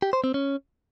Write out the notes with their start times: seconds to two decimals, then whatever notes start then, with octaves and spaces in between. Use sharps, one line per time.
0.02 G4
0.13 C5
0.24 C4
0.34 C#4